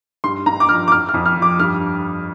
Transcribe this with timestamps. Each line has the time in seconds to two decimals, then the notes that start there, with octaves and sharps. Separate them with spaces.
0.24 G2 C6
0.46 G2 A#5
0.60 D6
0.69 F3 F6
0.88 D6
0.92 F2 F6
1.09 F6
1.14 F2
1.26 F6
1.37 F3
1.42 D6
1.60 G2 F6